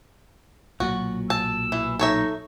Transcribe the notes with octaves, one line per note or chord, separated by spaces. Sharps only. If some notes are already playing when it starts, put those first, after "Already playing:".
B1 A#2 F#3 F#4
A5 E6
E3
D#4 A4 C#5 E5